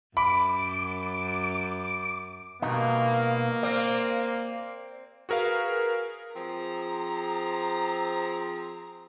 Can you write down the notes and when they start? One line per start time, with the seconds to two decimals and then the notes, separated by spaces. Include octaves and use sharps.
0.17 F#2 B5 D6
2.62 G2 B2 A#3 B3 D#4
3.63 C4 D5 F5
5.29 F#4 G#4 A#4 B4 F5
6.36 F3 C4 G#4 A#5